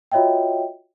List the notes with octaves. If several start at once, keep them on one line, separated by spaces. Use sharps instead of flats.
F4 F#4 C#5 D#5 E5 G5